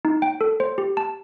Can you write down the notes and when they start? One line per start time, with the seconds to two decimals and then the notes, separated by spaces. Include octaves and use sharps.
0.05 D#4
0.22 G5
0.41 A4
0.60 C5
0.78 G4
0.97 A5